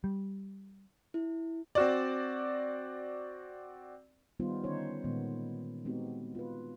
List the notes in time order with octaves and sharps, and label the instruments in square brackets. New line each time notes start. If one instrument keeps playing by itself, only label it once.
[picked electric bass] G3
[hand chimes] E4
[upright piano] C4 F#4 D5
[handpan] D#3 G3 B3 D#4 F4 C5
D3 D#3 C#4 D#4 C5 C#5
A#2 D#3 G#3 B3
G#3 B3 C4 D#4 F#4 G4
F4 B4